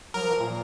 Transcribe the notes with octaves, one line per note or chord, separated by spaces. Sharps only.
F#3 A#4
F3
E3
A#2